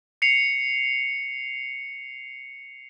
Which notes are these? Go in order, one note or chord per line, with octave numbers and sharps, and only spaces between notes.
C7 C#7 F7